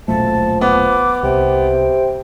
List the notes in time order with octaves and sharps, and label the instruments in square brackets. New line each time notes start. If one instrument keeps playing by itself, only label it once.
[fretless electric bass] D#1 B1 A3 [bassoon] F3 [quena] A5
[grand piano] B3 [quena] D6
[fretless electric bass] C2 [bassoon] C3 [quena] G5